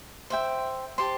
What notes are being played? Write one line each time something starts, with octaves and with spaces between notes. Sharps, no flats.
C5 E5 G5
G4 C5 A5 C6